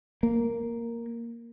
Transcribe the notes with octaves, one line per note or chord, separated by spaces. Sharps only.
A#3